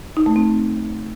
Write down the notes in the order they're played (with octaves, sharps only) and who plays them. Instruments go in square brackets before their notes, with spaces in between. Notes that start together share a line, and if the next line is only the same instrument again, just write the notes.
[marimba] D#4
A3
C4